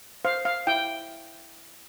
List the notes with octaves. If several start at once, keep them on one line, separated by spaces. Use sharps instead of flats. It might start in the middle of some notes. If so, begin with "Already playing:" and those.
C5 F5
F5
E4 G5